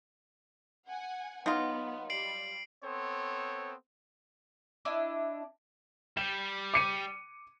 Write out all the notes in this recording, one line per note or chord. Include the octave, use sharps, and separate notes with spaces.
F#5 G#5
F#3 B3 D#4 F4
G3 C7 D7 F#7
B3 C4 A4 C5 C#5
D4 E4 D#5
G3 E7
D6 C#7 D#7